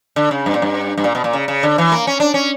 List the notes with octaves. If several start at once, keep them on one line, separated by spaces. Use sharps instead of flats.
D3
C#3
G2
A#2
G2
G2
A#2
B2
A#2
C#3
C#3
D3
E3
A#3
C#4
D4
C#4